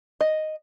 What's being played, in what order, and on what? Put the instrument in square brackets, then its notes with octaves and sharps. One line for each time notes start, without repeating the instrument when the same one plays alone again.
[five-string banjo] D#5